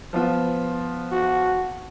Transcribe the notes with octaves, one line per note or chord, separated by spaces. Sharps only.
F3 B3 F4
F#4